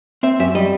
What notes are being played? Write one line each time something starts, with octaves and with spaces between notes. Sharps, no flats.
C4 E5
F#2 E5
G3 D#5